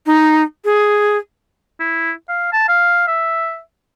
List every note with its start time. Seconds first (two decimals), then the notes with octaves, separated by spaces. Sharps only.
0.06 D#4
0.65 G#4
1.80 E4
2.29 F5
2.53 A5
2.68 F5
3.07 E5